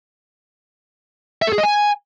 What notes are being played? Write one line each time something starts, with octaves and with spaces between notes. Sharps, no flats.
E5
A4
G#4
D#5
G#5